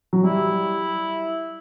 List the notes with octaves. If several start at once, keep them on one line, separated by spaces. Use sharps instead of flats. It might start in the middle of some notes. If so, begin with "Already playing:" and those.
F#3
G3 E4